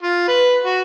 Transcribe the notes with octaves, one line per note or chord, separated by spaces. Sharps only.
F4
B4
F#4